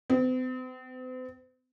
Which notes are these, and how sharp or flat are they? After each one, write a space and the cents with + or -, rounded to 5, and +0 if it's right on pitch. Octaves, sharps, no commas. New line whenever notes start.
C4 -45